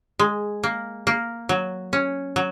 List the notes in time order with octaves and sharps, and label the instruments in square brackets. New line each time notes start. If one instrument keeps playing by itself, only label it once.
[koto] G#3
A#3
A#3
F#3
C#4
F#3